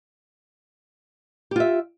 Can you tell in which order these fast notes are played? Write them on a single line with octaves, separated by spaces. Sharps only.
G4 F4 E5